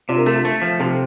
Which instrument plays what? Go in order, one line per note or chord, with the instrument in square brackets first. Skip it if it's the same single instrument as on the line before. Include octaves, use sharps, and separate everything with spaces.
[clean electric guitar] C3 [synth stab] D4 F4
[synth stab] A#4
[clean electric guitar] A3 [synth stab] F4 A4
[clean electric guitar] A3
F3
[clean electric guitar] C3 [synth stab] F4 A4